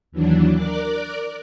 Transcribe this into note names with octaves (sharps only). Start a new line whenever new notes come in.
D#2 E3 F#3 D4
A#4 D5 D6 F#6